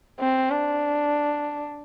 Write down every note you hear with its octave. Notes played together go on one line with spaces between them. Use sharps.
C4
D4